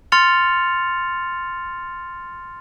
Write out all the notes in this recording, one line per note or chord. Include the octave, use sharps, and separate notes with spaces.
C6 F6 A6 C#7 F7